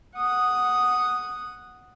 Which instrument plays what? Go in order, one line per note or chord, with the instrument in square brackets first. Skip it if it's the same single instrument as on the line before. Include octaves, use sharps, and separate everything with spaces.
[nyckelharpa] F#5 D#6